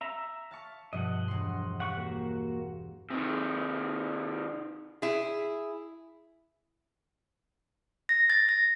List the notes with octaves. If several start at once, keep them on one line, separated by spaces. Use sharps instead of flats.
E5 A#5
F5 A5 C#6
G2 B2 F3 D#5 F#5
E1 C6
G4 F#5 C#6
A#3 F#4
C3 D#3
E4 G#4
A#6
A6
A#6